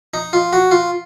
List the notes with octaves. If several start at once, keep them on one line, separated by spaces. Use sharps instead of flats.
D#4
F4
F#4
F4